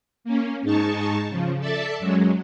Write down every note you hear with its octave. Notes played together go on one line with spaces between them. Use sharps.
A#3 C#4
G#2 G#3 D#4 A5 C#6
C#3 F3
A4 D5 E5 A5
F#2 F#3 G#3